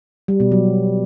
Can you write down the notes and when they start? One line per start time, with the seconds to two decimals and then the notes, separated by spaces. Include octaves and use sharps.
0.28 G3
0.40 B2
0.52 F#3